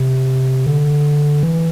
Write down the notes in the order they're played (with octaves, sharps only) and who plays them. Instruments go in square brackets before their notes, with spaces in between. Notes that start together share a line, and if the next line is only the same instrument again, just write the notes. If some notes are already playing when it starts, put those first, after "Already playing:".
Already playing: [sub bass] C3
D3
E3